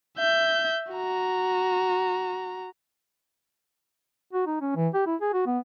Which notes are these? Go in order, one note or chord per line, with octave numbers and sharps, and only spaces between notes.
E5 G6
F#4 A#5
F#4
D#4
C#4
E3
G4
E4
G#4
F#4
B3